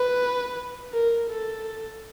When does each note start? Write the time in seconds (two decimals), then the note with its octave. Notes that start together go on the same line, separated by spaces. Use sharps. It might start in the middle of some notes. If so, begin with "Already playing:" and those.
Already playing: B4
0.93 A#4
1.30 A4